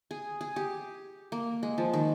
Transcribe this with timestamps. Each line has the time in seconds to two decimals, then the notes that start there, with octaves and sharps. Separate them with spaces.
0.11 G#4
0.41 G#4
0.56 G4
1.32 A#3
1.63 G#3
1.78 F3
1.93 D#3